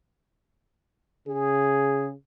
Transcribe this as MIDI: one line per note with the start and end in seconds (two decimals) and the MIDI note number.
1.28 2.14 49
1.28 2.11 68